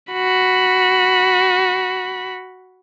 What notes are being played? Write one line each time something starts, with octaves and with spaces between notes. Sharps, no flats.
F#4 B5